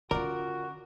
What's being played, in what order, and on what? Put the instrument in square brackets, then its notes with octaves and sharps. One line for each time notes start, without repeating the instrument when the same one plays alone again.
[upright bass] D3 C#4 [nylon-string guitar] F4 D5 [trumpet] F#4 [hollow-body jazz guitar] A#4